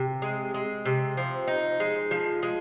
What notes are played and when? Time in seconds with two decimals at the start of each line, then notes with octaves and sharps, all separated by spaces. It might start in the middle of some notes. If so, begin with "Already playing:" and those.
Already playing: C3
0.22 G#3
0.54 G#3
0.86 C3
1.17 F3
1.48 D#4
1.80 G#3
2.11 F3
2.43 G#3